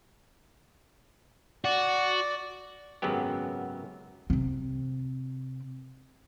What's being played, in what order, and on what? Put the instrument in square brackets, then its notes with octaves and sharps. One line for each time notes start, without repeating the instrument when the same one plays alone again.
[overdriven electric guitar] F#4 [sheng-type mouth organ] D5
[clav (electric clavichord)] G#1 F#2 C#3 F#3 B3 G4
[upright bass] C3 C4